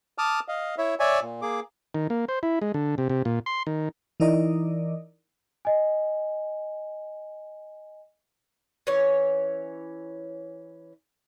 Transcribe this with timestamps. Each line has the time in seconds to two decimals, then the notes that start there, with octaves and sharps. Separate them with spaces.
0.18 A5 D6 D#6 F6
0.48 D#5 F5
0.78 E4 C#5 E5
1.00 C#5 D5 E5 G#5
1.22 A#2
1.42 A#3 G#4 D6
1.95 D#3
2.10 A#3
2.29 C5
2.43 E4
2.62 G#3
2.74 D3
2.98 C3
3.09 C3
3.25 A#2
3.46 C6
3.67 D#3
4.20 E3 D#4 E4 A#4 D5 D#5
5.65 D#5 G#5
8.87 E3 C#4 C#5